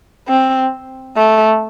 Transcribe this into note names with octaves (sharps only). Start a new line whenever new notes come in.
C4
A3